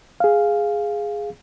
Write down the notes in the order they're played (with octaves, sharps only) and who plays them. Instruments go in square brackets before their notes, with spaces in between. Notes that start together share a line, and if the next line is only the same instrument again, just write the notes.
[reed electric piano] G#4 F5